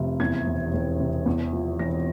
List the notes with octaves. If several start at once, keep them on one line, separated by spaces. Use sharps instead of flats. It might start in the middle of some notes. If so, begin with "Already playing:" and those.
Already playing: F1 C3
E2 G#6
E1
E1
C3
E2
F3
E1 A#6